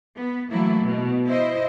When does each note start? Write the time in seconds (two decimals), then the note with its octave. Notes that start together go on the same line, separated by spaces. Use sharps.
0.15 B3
0.51 E3 F#3 A3 A#3 E4
0.81 B2
1.26 E4 C5 D#5